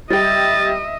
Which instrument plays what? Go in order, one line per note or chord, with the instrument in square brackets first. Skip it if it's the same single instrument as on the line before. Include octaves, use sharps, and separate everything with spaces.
[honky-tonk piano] G3 G4 [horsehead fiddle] D#5 E5 [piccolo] A6